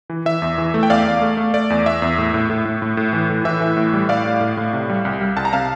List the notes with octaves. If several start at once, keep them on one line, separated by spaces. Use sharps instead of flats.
E3
E3 E5
E2
E3
A3
G5
E2 D5 F5
E2
A3
A3
A3 D5
E2
E2 E5
E2
A2
A2
A2
A2
A2
A2
E3
A2
E3 E5
E3
A2
G3
A2 D5 F5
A2
A2
A2
C3
G3
C2
G3
C2 A5
A#5
C3 F5 A5